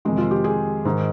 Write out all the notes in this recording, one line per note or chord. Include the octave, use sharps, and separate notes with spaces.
F2 C3 D#3 G#3
F4
G4
G#4
G#2 D#3